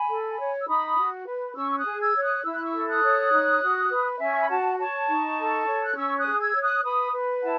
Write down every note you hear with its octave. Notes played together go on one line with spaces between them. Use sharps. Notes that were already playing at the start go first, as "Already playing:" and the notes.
Already playing: G#5 B5
A4
C#5
E6
D#4 B5 D#6
F#4
B4
C#4 C#6 E6
E6
D#6 F#6
G#4
E6 G#6
C#5
D#6 F#6
E4 E6
F#6
C#6 E6
A4
D#6 F#6
C#5
D#4
F#4
B4
C#4 E5 G#5
C#6
B5
F#4 F#5 A5
C#5 A5 C#6
D#4
A4
C#5
F#6
C#4 C#6 E6
D#6 F#6
G#4
E6 G#6
C#5
D#6 F#6
B4 B5 D#6
B4
E4 F#5 A5